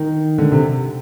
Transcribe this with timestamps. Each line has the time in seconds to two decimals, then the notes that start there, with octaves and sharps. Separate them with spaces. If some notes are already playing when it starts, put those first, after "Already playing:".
Already playing: D#3
0.38 D3
0.52 C3